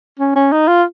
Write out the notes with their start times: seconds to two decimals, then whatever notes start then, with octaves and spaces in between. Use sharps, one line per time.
0.19 C#4
0.36 C#4
0.52 D#4
0.68 F4